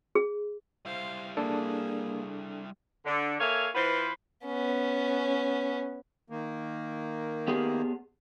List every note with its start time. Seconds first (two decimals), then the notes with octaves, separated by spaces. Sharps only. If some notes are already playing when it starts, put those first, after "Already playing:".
0.15 G#4
0.86 G3 E4 C5 F5
1.37 A#3 D4 G#4 A4
3.05 D3
3.40 A#3 A4 C#5 E5 F5 G#5
3.75 E3 F4 B4 C5
4.46 B3 C#4
6.30 D#3 A#3
7.48 B3 G4 G#4